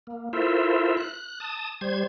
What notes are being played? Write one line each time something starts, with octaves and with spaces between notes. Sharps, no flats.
A#3
E4 F4 A4 A#4 C5 E5
F#6
A5 D#6
G3 C5 G#6